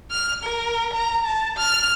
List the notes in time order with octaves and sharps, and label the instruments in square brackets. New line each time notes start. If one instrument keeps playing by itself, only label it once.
[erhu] F6
A#4
A#5
A5
F6